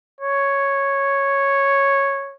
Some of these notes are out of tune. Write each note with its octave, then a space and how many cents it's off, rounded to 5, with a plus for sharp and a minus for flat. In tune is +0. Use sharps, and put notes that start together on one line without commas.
C#5 -5